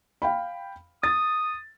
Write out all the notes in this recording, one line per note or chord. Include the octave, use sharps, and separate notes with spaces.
F5 G5 B5
D#6 A6